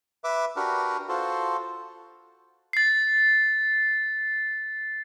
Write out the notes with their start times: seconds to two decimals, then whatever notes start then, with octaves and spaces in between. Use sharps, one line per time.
0.24 B4 E5 D6
0.56 D4 F#4 G4 A#4 B4
1.09 F4 F#4 A4 C5
2.73 A6 C7